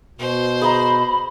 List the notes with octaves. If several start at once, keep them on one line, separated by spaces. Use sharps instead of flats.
B2 C5
G#4 D#5 A#5 B5